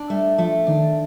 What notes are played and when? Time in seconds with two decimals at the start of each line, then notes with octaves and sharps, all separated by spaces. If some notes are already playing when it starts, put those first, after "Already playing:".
Already playing: D4
0.10 G3 A3
0.38 F3 A3
0.67 D#3 D4